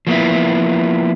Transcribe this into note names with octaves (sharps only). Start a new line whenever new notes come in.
F3 A#3 B3 E4